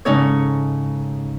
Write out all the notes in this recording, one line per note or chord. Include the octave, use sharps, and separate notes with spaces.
G#2 C#3 C#4 D#4 A4 C#5